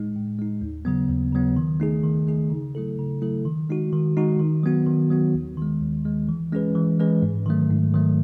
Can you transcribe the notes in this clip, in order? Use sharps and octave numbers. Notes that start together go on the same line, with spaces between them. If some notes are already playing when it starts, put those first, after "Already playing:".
Already playing: A2 G#3 D#4
A2
G#3 D#4
D#2
C#3 F#3 B3
D#2
C#3 F#3 B3
D#3
A3 D#4 G#4
D#3
A3 D#4 G#4
C#3
F#3 A3 E4 A4
C#3
F#3 A3 E4 A4
D#3
G#3 D#4 F#4
D#3
G#3 D#4 F#4
D#3
F#3 B3 F#4
D#3
F#3 B3 F#4
D#2
D#3 G#3
D#2
D#3 G#3
E3
G#3 C#4 G#4 B4
E3
G#3 C#4 G#4 B4
G#2
D#3 F#3 A3
G#2
D#3 F#3 A3